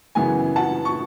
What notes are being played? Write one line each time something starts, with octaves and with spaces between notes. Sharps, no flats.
F#2 C#3 E3 B3 G#5
F#5 A5
C#6